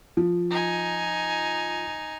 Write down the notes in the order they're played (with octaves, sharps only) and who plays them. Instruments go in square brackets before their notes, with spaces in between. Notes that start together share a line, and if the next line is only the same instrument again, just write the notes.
[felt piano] F3
[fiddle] D#4 G#5